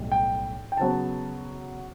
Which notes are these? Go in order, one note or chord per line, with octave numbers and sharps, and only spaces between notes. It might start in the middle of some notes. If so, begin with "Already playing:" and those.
Already playing: B1 A2 G3
G5
G5
C#3 F#3 B3 A5